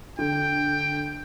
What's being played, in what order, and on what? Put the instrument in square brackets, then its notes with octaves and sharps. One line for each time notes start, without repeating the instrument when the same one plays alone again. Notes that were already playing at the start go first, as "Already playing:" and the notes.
[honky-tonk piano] D3 [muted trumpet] G5